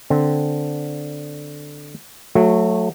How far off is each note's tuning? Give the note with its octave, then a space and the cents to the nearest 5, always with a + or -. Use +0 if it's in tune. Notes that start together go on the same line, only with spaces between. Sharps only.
D3 +0 C4 -5
F#3 -25 A3 +0